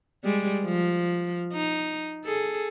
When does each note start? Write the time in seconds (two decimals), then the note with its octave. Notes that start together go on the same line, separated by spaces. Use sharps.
0.24 G3 G#3
0.64 F3
1.53 D#4
2.24 G#4 A4